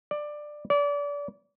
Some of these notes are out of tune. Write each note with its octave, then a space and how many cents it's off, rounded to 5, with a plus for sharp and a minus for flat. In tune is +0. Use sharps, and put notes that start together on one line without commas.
D5 +15
D5 -30